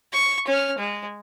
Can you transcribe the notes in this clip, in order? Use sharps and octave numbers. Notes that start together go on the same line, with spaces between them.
C#6
C#4 F6
G#3